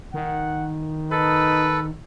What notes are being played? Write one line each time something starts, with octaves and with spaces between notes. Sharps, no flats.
D#3 F#5
D#4 A4 B4